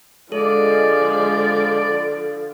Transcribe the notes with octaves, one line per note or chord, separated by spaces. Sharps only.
D3 F3 G#3 A4 D5